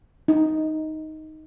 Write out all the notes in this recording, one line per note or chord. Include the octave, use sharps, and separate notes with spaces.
D#4